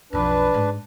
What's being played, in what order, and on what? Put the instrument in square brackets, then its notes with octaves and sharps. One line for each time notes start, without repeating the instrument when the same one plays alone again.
[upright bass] B1 F2 [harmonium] D4 B4
[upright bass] G#2 G#3